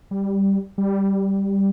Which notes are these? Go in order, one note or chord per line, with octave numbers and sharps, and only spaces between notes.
G3
G3